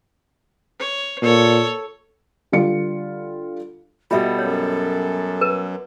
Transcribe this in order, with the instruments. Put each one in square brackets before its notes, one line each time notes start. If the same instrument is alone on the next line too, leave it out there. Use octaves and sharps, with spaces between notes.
[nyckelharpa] C#5
[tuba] A#2 [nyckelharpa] A4 C#5
[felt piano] D3 G3 F4 C#7
[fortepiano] B2 G3 [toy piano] F4 E5 [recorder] A4
[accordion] F#2 [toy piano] C#5
[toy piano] A#4 B4